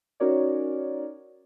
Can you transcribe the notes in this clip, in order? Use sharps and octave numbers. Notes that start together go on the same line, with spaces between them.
C#4 D#4 F#4 A#4 C#5 D5